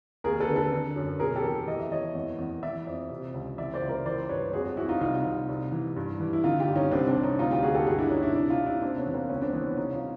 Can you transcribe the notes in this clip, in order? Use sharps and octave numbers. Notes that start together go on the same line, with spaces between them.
D#2 G#4 A#4
A4 B4
D3
A4 B4
D3
F#2
B2 G#4 A#4
G4 A4
E2
E3 D#5
E5
E3 C#5 D#5
E2
E2
E3 D5 E5
F2
C3
C#2
E3 D5 E5
C5 D5
C#2
A#4 C5
E3 C5 D5
G2 B4 C#5
F2 F#4 G#4
F2 E4 F#4
D#4 F4
C2 D#4 F4
C2
C2
E3
G2
E3
E4
D3 D#4 F4
F4 G4
G2
C#4 D#4
C2 C4 D4
C4 D4
C2
C#4 D#4
D2 D#4 F4
F4 G4
D2 F#4 G#4
G4 A4
G2 F#4 G#4
D4 E4
G2 C#4 D#4
D4 E4
C3 D4 E4
D#4 F4
C3
D4 E4
C3 C4 D4
B3 C#4
E2
A#3 C4
C#2 B3 C#4
C4 D4
E3 B3 C#4
C2 C#4 D#4
D#4 F4